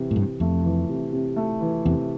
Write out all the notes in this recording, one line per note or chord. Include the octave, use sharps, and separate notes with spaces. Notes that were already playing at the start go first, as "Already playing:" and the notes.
Already playing: C3 E3
A2
G2 C3
F2 A3
E3
C3
C3
A3
E3
E2 C3